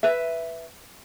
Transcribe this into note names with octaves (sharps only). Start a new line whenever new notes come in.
B4 E5